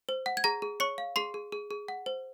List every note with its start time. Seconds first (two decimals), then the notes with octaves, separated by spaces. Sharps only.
0.09 C5
0.26 F#5
0.37 G#6
0.44 G#4 A#5 A#6
0.62 G#4
0.80 C#5 C#6 C#7
0.98 F5
1.16 G#4 C6 C7
1.34 G#4
1.52 G#4
1.71 G#4
1.88 F#5
2.06 C5